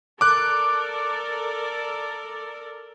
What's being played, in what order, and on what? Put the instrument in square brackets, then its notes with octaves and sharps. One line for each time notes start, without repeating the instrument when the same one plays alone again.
[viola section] A4 A#4 D5 [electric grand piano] D6 F#6